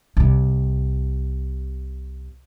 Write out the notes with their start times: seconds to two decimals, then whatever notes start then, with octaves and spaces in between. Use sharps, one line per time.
0.17 C2 C3